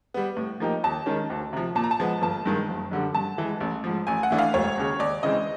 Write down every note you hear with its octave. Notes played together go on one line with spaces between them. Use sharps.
G3 B3
A2
F3 A#3 D#4 G4
D#2 A5
D#3 G#3 C#4
D2
C3 F3
A#2 A5
A#5
A5
F3 G#3 B3
G1 A5
G2 D#3 G#3
F#1
F#2 D3 G3
G2 A5
E3 G#3
A1
G#2 F3
A1 G#5
F#5
A2 E3 A3 D4
F5
E1 C#5
D#2 C#3
D#2 D5
C#3 E3 G#3 C4 D#5